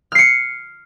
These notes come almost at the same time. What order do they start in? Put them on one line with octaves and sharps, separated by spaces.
F6 C7 C#7